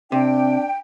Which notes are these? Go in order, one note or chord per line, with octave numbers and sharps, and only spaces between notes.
C3 D4 G5